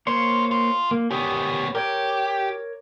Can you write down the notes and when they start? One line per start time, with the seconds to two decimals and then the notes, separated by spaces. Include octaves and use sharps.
0.07 A#3 F4 C5 C#5
0.51 F4
0.91 A#3
1.11 B3 C#4 G4 D#6
1.75 G4 A#4 C#5 D6